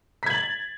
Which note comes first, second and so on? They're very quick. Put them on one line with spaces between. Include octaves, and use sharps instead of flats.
B6 G#6 F#7 A6